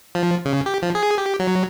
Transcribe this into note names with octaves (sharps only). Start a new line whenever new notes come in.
F3
C#3
G4
F3
G#4
G4
F#3